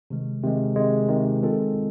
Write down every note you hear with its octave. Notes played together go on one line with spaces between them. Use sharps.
C3 D#3 G#3
C3 D#3 G#3
C3 D#3 G#3
C3 D#3 G#3
D#3 G#3 C4 F4 A4